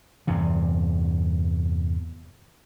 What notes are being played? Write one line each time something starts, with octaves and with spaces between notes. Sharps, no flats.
E2 G2 C3